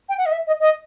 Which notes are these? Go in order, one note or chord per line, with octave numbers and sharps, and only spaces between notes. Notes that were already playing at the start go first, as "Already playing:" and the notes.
G5
F#5
D#5
E5
D#5
D#5